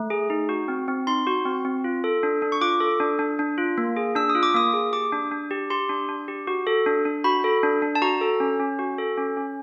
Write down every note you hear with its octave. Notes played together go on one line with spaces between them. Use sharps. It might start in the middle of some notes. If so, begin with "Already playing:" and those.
Already playing: A3
G#4
D#4
F#4
C4
C4
D#4 C6
F#4
C4
C4
F4
A4
D4
D4
C#6
F4 D6
A4
D4
D4
D4
F4
A#3
G#4
D4 E6
D#6
F4
D6
A#3 D#6
G#4
G4 D6
D4
D4
G4
G4 C6
D4
D4
G4
F#4
A4
D4
D4
F#4 B5
A4
D4
D4
A5
F#4 A#5
A4
C#4
C#4
F#4
A4
C#4
C#4